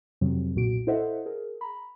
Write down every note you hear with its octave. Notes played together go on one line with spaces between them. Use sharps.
F2 C3 F#3
B1 A#2 F#4 D7
E4 A4 C5 D#5 E5 F#5
G#4 A#4
A#5 B5